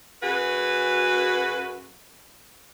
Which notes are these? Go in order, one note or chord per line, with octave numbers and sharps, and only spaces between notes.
F#2 F#4 G#4 B4